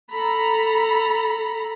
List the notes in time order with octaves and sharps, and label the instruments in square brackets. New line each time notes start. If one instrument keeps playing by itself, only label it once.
[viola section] A4 A#5 B5